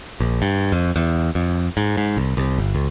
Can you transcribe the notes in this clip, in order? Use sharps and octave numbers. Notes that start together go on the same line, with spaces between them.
A#1
G2
F2
E2
F2
G#2
G#2
C2
C2
G1
C#2